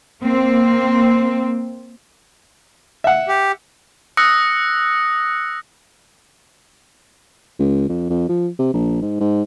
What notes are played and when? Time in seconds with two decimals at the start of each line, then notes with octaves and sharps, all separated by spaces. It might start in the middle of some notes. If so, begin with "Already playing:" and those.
0.23 A#3 C4
3.04 E5 F#5
3.28 G4
4.17 D#6 E6 F#6 A#6 C#7
7.59 C#2
7.89 F2
8.10 F2
8.29 F3
8.59 C3
8.74 A#1
9.02 G#2
9.20 G#2